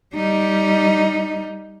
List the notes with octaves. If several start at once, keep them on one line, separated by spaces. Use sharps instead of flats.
G3 D#4